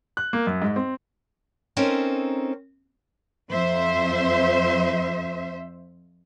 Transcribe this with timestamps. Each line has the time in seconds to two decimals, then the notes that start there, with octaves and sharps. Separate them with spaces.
0.17 F#6
0.33 A#3
0.47 F#2
0.62 G#2
0.76 C4
1.77 C4 C#4 D#4 A4 A#4 C5
3.50 F2 C5 E5